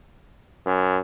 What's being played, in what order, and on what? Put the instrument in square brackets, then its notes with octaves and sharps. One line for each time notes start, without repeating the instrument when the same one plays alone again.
[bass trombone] F#2